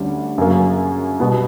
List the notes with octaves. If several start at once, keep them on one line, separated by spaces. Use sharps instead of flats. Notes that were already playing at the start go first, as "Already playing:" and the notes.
Already playing: D2 D3 G3 C#4
F#2 C#3 F#3 A#3
B2 G3 B3